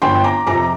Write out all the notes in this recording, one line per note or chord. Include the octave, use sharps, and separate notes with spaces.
G1 G5 C6
A#5 D6
F2 C3 A#5 D6